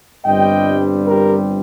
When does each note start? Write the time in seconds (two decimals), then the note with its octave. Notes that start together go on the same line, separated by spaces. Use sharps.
0.25 G1 G2 G3 C4 D#5 G5
1.05 G4 A#4